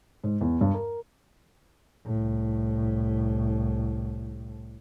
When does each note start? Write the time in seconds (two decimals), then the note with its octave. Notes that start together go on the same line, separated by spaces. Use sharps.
0.24 G#2
0.41 E2
0.61 G2
0.74 A#4
2.06 C2 A2